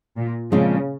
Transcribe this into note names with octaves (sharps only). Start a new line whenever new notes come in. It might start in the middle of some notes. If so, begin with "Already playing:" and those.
A#2
A#2 C#3 F3 G#3 C4 F4